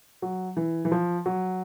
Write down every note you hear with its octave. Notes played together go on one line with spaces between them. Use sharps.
F#3
E3
E3
F3
F#3